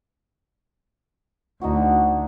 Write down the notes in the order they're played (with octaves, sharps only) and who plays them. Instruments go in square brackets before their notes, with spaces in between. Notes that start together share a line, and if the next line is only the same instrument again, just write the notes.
[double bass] D2 [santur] D#4 E4 F#4